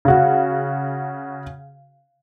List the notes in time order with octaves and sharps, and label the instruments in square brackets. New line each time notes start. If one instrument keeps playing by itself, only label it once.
[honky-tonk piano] C#3 F#4